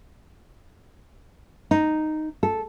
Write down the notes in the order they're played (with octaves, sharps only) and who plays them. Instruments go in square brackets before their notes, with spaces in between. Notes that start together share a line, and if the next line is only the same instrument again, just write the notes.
[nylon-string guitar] D#4
A4